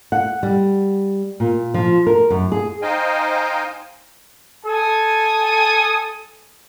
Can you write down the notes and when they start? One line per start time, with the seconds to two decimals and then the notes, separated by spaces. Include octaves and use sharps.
0.12 F#5
0.43 G3
1.40 A#2
1.74 F3
2.07 A#4
2.30 F#2
2.52 G#4
2.81 D#4 C5 D#5 F5 G5 G#5
4.66 A4 G#5 D#6